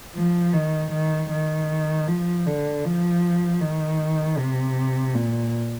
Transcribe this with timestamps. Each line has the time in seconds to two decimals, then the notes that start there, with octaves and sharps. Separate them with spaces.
0.15 F3
0.53 D#3
0.92 D#3
1.31 D#3
2.07 F3
2.46 D3
2.84 F3
3.61 D#3
4.38 C3
5.15 A#2